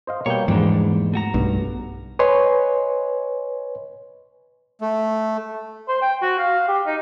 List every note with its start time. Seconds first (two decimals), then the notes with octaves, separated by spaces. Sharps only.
0.07 C5 D#5 F5
0.26 B2 G3 A#3 C#5 G5
0.48 E2 G#2 F3 G3 A#3 D4
1.14 A3 F#4 A#5
1.34 B1 G2
2.19 B4 C#5 D#5 G#5 C6
4.81 A3
5.88 C5
6.02 G5
6.22 F#4
6.38 F5
6.68 G4
6.86 D#4